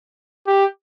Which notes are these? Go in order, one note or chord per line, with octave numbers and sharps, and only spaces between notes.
G4